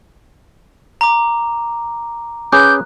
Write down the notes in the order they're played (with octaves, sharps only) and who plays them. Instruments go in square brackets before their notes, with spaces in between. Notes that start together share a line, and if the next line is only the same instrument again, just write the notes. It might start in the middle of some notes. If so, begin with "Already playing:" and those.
[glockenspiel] A#5 D6
[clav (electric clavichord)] C#4 G#4 B4 [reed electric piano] D6 [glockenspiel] F#6 [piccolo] G6